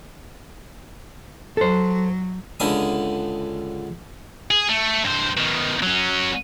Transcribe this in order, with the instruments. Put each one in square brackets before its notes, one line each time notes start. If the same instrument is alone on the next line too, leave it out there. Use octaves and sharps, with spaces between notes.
[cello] F#3 [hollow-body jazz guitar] A4 C5
[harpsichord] C#2 D3 B5 D#6
[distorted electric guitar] G#4
A3
G2 C5
B2 D#3
F#3 C#4